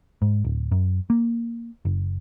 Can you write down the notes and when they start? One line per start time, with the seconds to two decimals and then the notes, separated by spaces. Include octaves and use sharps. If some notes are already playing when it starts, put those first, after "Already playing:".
0.22 G#2
0.45 D1
0.72 F#2
1.10 A#3
1.85 F#1